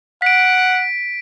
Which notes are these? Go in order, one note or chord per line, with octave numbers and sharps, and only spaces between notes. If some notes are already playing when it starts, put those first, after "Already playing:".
F#5 B6 D7